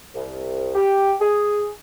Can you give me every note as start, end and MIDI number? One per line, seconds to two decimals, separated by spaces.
0.14 0.71 36
0.75 1.13 67
1.20 1.67 68